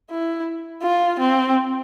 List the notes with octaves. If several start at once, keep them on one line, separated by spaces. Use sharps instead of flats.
E4
F4
C4